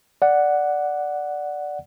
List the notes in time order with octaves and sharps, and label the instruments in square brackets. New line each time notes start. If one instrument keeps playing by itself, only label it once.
[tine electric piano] D5 F#5